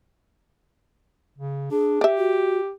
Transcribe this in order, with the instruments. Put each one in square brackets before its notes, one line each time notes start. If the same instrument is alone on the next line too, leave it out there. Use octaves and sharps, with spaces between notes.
[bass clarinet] C#3
[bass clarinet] D4 [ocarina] G#4
[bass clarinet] G4 [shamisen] D5 E5
[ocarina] F#4